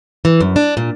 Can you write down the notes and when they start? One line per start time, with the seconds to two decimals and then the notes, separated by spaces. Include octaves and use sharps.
0.25 E3
0.40 F#2
0.56 D4
0.77 A#2